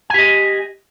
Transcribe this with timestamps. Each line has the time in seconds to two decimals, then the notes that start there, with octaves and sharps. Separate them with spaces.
0.10 G#5
0.14 G4
0.18 D#5